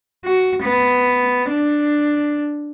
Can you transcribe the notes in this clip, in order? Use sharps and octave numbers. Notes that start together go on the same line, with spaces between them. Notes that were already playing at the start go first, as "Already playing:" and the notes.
F#4
B3
D4